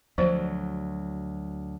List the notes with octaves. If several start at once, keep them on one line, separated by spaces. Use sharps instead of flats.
D2 F3 F#3 C5